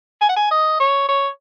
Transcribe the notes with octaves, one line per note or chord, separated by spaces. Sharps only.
G#5
F#5
G#5
D#5
C#5
C#5